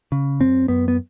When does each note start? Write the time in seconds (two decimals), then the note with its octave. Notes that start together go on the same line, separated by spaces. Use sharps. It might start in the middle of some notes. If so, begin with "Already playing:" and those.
0.12 C#3
0.40 F#2 C4
0.68 F#2 B3
0.88 B3